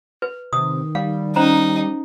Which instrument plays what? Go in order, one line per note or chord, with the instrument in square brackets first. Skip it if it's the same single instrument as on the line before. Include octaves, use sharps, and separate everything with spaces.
[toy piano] B4
[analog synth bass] C3 [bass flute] D#3 [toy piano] D#6
[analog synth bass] G3 [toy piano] F5
[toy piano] C#4 C5 A#5 [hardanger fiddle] D#4